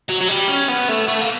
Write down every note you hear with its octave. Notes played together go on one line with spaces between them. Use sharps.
F#3
F#3
G3
C#4
B3
A3
A3
A#3